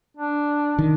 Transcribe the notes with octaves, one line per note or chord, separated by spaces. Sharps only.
D4
D#3